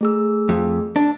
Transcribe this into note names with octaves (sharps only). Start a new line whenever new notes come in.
A3 G#4 E6
F2
D4